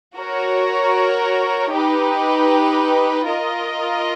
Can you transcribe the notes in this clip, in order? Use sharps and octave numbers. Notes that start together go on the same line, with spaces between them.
F#4 A#4 C#5
D#4 G4 B4
F4 A#4 D#5